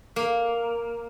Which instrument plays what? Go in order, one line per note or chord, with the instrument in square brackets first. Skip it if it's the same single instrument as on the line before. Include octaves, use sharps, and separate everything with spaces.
[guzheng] A#3